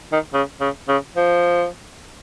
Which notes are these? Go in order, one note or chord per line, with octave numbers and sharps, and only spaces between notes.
D#3
C#3
C#3
C#3
F3